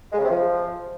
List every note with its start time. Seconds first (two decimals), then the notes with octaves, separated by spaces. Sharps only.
0.13 G#3
0.19 C#3
0.24 C3
0.30 F3